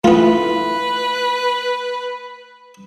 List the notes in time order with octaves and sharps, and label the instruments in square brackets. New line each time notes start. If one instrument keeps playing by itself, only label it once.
[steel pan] A3 E4 [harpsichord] B3 F4 [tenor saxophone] B4